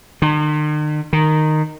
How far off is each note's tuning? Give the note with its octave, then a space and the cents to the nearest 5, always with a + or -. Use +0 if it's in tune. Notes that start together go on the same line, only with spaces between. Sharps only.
D#3 -45
D#3 -10